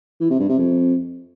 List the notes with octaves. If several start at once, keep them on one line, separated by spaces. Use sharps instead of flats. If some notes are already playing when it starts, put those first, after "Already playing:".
E3
C3
G2
C3
F2